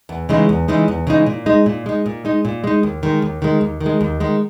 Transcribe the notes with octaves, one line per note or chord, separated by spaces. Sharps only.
E2
C#3 E3 G#3 D#4
E2
C#3 E3 G#3 D#4
E2
C#3 E3 G#3 D#4
A#2
G#3 D#4
A#2
G#3 D#4
A#2
G#3 D#4
A#2
G#3 D#4
D#2
D#3 G#3
D#2
D#3 G#3
D#2
D#3
G#3
D#2
D#3 G#3